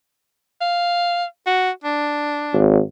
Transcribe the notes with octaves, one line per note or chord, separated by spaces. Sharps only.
F5
F#4
D4
G#1